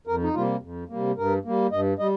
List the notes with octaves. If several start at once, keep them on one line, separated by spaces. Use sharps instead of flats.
F2 A#4
D#4
C3 G3 A#3 F4
F2
C3 G3 A#3
G2 A#4
G3 A#3
G2 D#5
G3 D#5